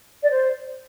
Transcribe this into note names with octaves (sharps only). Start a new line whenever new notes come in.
D5
C5